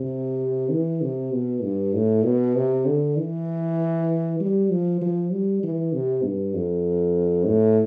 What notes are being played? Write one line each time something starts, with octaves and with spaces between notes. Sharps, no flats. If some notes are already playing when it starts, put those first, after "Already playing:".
Already playing: C3
E3
C3
B2
G2
A2
B2
C3
D3
E3
G3
F3
F3
G3
E3
C3
G2
F2
A2